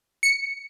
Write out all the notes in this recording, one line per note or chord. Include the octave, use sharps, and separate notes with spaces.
C#7